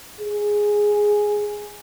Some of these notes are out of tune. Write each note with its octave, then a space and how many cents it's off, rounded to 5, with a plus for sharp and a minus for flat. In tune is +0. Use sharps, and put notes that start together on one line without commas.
G#4 +0